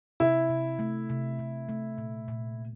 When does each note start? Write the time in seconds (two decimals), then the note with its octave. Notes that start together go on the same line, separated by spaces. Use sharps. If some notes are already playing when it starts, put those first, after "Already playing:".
0.20 C3 E4
0.50 C3
0.79 A3
1.10 C3
1.39 C3
1.69 A3
1.98 A#2
2.28 A#2